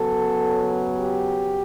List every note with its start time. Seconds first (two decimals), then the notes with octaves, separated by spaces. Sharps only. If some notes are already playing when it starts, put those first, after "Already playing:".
Already playing: C#3 F#3 B3 A4
0.97 G4